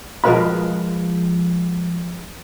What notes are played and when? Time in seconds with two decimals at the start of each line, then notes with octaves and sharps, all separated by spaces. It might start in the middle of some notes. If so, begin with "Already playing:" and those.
0.24 F3 G#3 A#4 B4 F5 B5